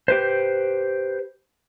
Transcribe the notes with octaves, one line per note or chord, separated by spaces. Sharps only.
G4 B4 C5